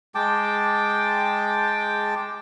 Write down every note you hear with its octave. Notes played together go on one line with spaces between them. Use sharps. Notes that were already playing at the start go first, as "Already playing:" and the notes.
G#3 G5 A5 D6